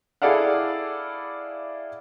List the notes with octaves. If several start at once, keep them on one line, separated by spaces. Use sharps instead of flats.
E4 G#4 A4 D5 F5 F#5